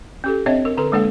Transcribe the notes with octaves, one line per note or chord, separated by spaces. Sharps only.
C#4 G4 A4
C4 D4 C#5 D#5 E5
A#4
D3 A4 B4 C6
G#3 A#3 D4 A4 F#5